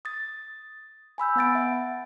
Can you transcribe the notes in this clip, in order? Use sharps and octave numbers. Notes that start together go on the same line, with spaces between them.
D#6 A6
G#5 B5 E6 G6
B3 F#5 A6 D7
E5 F#5